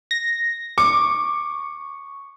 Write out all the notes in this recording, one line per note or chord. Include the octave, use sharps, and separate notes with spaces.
A#6
C#6 D6